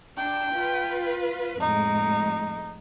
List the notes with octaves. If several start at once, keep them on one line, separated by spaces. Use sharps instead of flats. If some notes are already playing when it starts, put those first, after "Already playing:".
D4 G5
F4 B4
F2 A2 G#3 D#4